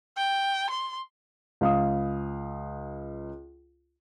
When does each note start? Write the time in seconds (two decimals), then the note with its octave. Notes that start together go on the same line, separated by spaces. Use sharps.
0.17 G5
0.71 C6
1.61 C#2 F5 D#6